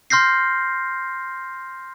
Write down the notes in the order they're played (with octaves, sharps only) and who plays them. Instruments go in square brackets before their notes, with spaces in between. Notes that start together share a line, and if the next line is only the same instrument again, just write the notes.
[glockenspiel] C6 F6 G6 A#6 C7